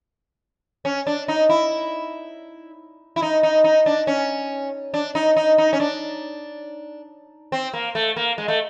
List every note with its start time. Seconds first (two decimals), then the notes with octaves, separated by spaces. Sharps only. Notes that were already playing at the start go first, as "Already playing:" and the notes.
0.85 C#4
1.07 D4
1.28 D#4
1.49 E4
3.16 E4
3.22 D#4
3.43 D#4
3.64 D#4
3.86 D4
4.07 C#4
4.94 D4
5.15 D#4
5.36 D#4
5.58 D#4
5.73 C#4
5.80 D4
7.52 C4
7.73 A#3
7.95 A3
8.16 A#3
8.38 G#3
8.48 A3